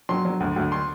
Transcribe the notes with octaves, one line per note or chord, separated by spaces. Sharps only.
F#3 C6
F#3
D2
D2
C6